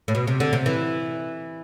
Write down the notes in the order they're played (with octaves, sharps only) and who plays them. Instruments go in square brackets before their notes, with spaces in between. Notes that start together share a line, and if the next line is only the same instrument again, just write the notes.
[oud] A2
B2
C3
D3
C3
E3